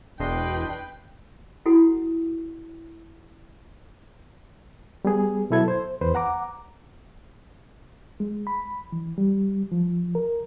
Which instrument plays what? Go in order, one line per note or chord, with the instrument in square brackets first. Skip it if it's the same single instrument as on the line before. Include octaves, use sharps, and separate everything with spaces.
[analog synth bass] E1 [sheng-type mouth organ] D4 D#5 C6 [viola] B4 G5
[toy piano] E4 F#4 A4 F#5
[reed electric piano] G3 B3 G#4
B2 F#3 E4 A4 G#6
C5
E2 B4 C5
F#5 A#5 D6
G#3
B5
E3
G3
F3
A#4